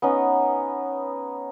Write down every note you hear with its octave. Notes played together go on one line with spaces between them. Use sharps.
B3 C#4 D#4